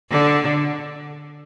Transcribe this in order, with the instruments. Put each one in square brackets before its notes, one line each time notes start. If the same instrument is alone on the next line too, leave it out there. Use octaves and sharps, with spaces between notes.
[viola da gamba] D3